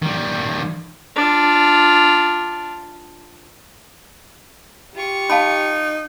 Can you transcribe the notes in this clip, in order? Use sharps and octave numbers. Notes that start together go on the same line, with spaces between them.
D#3 G3
D4 F4
F4 G4 C#6
D#4 F5 A5 B5